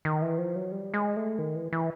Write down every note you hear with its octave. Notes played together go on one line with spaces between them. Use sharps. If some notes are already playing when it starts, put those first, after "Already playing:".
D#3
E3
F3
F#3
G3
G#3
A3
D#3
E3
E3